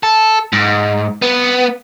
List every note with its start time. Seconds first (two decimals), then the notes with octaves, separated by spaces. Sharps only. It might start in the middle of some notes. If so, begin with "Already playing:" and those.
0.03 A4
0.53 G#2
1.22 B3